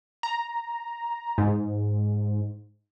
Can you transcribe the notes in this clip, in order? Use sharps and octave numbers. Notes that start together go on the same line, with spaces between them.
A#5
G#2